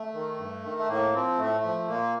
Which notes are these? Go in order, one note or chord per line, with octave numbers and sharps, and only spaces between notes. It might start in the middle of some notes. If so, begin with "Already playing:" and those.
Already playing: A3
D#3
G2
D#3
A3
A2 A#3
F3 C4
A2 A3
F3
A#2 A#3